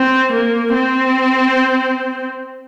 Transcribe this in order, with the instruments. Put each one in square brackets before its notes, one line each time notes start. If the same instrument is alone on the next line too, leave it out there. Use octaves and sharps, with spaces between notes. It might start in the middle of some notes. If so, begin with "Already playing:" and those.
Already playing: [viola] C4
A#3
C4